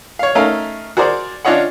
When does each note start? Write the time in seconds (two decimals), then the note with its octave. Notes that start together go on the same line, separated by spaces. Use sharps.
0.19 C#5 F5
0.35 A3 C#4 D#4 A#4 F5
0.97 F#4 G#4 A#4 C5 D5
1.45 C#4 D4 F4 C#5 D#5 F#5